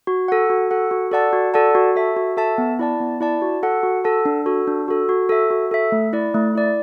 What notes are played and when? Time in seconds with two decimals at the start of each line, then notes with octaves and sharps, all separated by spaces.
0.07 F#4
0.28 A4 F#5
0.50 F#4
0.71 A4 F#5
0.91 F#4
1.12 A4 D5 F#5 A5
1.33 F#4
1.54 A4 D5 F#5 A5
1.75 F#4
1.96 A4 E5 A5
2.16 F#4
2.37 A4 E5 A5
2.58 B3
2.79 E4 D5 A5
3.00 B3
3.21 E4 D5 A5
3.42 F#4
3.63 A4 F#5 A5
3.83 F#4
4.04 A4 F#5 A5
4.25 D4
4.46 F#4 A4
4.67 D4
4.88 F#4 A4
5.09 F#4
5.29 A4 E5
5.51 F#4
5.71 A4 E5
5.92 A3
6.13 E4 D5
6.34 A3
6.55 E4 D5